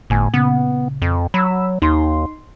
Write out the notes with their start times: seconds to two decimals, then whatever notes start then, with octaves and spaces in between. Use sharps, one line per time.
0.10 G1 A2 G#5
0.34 A#2 C#3 B3
1.02 F2
1.34 F#3 B5 E6
1.82 D#2 D#4 C6